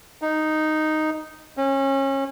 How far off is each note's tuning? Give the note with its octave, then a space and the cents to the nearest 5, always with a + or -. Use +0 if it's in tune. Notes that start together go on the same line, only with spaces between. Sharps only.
D#4 -5
C#4 -30